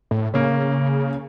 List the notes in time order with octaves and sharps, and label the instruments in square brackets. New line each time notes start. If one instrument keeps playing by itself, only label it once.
[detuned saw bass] A2
[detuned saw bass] C#3 [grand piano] A#3 C#4